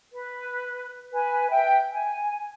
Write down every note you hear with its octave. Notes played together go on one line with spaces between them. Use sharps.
B4
B4 G#5
E5 G5
G#5